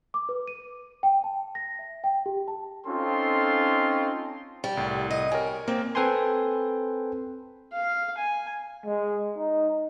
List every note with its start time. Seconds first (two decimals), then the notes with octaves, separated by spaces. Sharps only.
0.14 D6
0.29 B4
0.48 D#7
1.03 G5
1.24 A5
1.55 A#6
1.79 E5
2.04 G5
2.26 G4
2.48 A5
2.87 C4 C#4 D#4 F4 A4 C6
4.64 G3
4.77 C2 A2
5.11 D#5
5.32 G3 A#4 C#5 G#5
5.68 A#3 C4
5.95 C4 A4 B4 G5 G#5 C6
7.73 F5
8.18 G#5
8.86 G#3
9.38 D#4